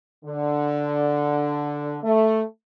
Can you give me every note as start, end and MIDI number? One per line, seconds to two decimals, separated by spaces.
0.25 1.98 50
2.03 2.41 57